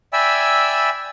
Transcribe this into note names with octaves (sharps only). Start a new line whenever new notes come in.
D5 E5 G5 G#5 B5 E6